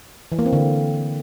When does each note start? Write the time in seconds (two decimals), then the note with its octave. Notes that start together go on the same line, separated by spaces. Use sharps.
0.32 E3
0.39 A#3
0.46 C4
0.53 D3